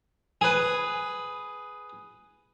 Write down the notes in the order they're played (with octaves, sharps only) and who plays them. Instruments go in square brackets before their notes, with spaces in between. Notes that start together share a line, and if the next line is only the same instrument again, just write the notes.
[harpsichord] G#4 B4